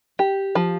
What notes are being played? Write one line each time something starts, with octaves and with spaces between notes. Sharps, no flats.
G4
F3